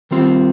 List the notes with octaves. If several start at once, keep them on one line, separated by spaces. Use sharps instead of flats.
D#3 G3 C4 F4